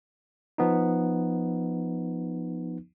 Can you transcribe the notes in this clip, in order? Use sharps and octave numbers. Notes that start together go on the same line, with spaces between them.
F3 B3 D#4